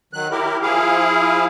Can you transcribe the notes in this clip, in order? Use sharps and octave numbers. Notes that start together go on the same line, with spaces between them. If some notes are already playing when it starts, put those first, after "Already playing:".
D#3 F#3 F#6
E4 G4 A#4
F3 E4 G#4 F5